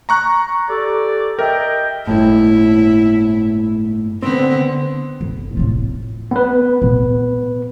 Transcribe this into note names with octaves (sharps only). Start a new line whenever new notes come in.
A#5 C#6 F#6
G4 A4 D5
A#4 D#5 E5 G5
G1 A2 E4
D3 B3 C4
G1
A2 F4
B3 B4
A#2